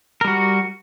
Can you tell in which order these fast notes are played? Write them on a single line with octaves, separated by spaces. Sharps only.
A#4 G3 F#4